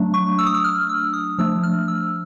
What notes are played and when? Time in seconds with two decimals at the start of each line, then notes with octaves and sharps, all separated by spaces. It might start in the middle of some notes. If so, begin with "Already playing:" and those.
Already playing: F#3 A3 D4
0.14 C#6
0.39 E6
0.47 D#6
0.54 E6
0.64 F6
0.89 E6
1.13 D#6
1.38 F3 A3 D4 E6
1.63 F6
1.88 E6